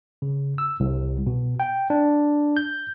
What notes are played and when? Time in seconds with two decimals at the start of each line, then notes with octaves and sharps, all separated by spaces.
0.22 C#3
0.58 E6
0.80 C2
1.27 B2
1.60 G5
1.90 D4
2.57 G6